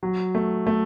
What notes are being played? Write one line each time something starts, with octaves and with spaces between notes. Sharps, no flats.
F#3
A3
A3